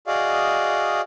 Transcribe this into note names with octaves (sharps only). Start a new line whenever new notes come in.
F#4 G#4 D5 D#5 F5